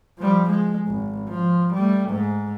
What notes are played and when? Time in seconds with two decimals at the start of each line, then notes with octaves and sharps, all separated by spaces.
0.19 F3 G3
0.50 G#3
0.87 G#1
1.30 F3
1.74 G3 A3
2.10 G#2